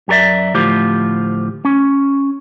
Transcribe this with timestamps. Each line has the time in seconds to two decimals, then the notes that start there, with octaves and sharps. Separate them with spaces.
0.08 F#2 G4 A#4 D5 E5
0.55 D2 A2 F3 F4 G4 C5
1.65 C#4